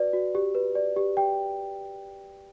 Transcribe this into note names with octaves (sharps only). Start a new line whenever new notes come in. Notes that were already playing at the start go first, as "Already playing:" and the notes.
Already playing: F#4 B4 D5
F#4
G4
B4
D5
G4
G4 G5